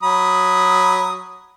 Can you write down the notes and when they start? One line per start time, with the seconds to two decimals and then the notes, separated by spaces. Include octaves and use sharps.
0.03 F#3 B5 D#6